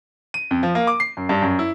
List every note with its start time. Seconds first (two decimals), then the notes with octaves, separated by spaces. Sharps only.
0.34 D#7
0.51 F2
0.63 F3
0.75 A#3
0.87 D6
1.00 C7
1.17 F#2
1.29 G2
1.42 F#2
1.59 E4